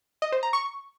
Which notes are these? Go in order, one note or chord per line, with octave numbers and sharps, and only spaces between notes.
D#5
C5
A#5
C#6